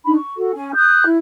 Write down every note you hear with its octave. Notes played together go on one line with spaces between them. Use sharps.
D4 D#4 B5
C#6
F#4 A4
C#4 G#5
D#6 F#6 G6
E4